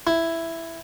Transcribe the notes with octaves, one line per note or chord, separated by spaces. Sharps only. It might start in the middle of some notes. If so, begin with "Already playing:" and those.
E4